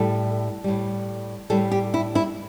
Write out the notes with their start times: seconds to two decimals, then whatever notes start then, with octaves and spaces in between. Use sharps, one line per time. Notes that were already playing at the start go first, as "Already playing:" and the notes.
Already playing: A2 G3 A4
0.64 A2 G3
1.50 A2 G3 A4
1.72 G4
1.94 E4
2.15 E4